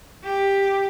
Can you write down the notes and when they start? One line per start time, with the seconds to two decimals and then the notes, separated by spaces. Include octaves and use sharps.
0.24 G4